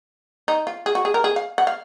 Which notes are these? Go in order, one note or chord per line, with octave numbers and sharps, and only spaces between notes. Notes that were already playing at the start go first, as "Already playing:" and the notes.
D#4
F4
G#4
F#4
G#4
A#4
G#4
F5
F#5
F5